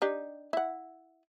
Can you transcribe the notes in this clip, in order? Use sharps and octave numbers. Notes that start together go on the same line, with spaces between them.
D4 D#4 G4
E4 F#5